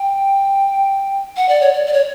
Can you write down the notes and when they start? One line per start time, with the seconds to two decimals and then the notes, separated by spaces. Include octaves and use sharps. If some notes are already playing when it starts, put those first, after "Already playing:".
Already playing: G5
1.37 F#5
1.49 D5
1.61 C#5
1.74 D5
1.86 D5
1.93 C#5